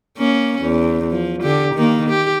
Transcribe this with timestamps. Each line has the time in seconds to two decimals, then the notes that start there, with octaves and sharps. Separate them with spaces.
0.18 A#3 C#4
0.62 E2
1.11 F3
1.43 D3 G4
1.74 D#3 A#3
2.09 G4